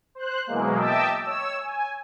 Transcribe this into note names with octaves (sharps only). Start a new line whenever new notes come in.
C5 F#6
B2 E3 F#3 G#3 A#3
D#5 E5 G5 A5 D6 E6
C#5 E6
G#5